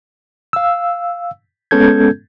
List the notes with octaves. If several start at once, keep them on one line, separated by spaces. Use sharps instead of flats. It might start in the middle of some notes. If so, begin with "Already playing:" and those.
F5 E6
G#3 B3 C#4 A4 G6 G#6